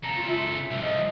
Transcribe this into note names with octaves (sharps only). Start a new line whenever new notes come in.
C#3 A4 A#5
F4
E5
C2 F3 E5
D#5